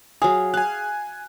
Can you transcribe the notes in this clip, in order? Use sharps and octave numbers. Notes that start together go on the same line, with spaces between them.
F#3 G#4 F5
F5 G#5 F#6